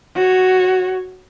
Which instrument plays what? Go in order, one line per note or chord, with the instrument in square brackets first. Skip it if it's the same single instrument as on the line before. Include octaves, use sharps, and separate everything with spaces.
[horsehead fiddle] F#4 C#5